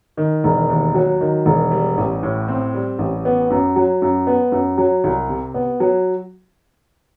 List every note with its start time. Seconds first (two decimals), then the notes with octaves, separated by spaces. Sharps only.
0.17 D#3
0.44 E1
0.69 D#2
0.95 F#3
1.21 D#3
1.46 E1
1.71 G3
1.97 A1
2.23 A2
2.48 C4
2.74 G3
2.99 A1
3.25 B3
3.50 F#2
3.76 F#3
4.02 F#2
4.27 B3
4.52 F#2
4.78 F#3
5.04 C2
5.29 C3
5.54 B3
5.80 F#3